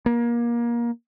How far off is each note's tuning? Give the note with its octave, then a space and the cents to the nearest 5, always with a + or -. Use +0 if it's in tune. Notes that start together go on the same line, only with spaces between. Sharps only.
A#3 +25